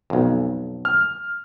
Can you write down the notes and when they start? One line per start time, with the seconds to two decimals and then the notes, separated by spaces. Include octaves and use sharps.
0.10 B1 F2
0.85 F6